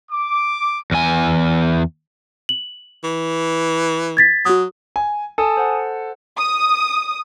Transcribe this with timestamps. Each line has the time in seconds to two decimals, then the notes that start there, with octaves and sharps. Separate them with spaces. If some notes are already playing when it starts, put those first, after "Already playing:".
0.12 D6
0.91 E2 G#5
2.49 F#7
3.04 E3
4.17 G#6 A6 B6
4.45 F#3 F#4 D#6
4.96 G#5
5.38 A4 G#5 A5 D#6
5.57 C5 F#5
6.38 D#6